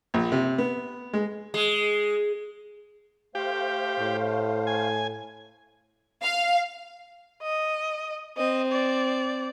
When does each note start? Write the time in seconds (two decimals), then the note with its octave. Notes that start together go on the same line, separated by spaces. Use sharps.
0.14 A#1
0.32 C3
0.58 B3
1.13 G#3
1.54 G#3
3.35 A3 G4 C5 F5
4.00 A2
4.67 G#5
6.22 F5
7.42 D#5
8.37 C4 D#5
8.72 D5